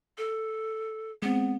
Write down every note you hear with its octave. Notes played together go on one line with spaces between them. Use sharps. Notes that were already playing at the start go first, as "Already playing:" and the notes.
A4
G#3 B3 C4